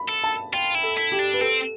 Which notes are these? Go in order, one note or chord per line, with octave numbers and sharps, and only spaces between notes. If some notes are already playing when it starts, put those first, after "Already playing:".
Already playing: B5
A4
A5
F4 G5
E4
A4
E4
G4
D4
B4
C4 A4